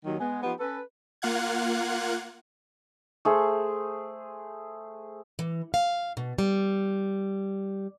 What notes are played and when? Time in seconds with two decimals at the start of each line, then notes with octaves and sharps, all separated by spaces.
0.05 D#2 D#3 F#3
0.20 G#3 B3
0.43 F3 B3 D#4 G4 B4
0.60 C#4 A4 B4
1.22 A#3 F4 F5 F#5 F#6 G#6
3.25 A3 G#4 C5
5.39 E3
5.74 F5
6.17 B2
6.38 G3